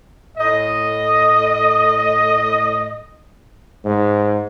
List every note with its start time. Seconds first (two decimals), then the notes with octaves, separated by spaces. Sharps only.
0.38 A2 D#5
3.85 G#2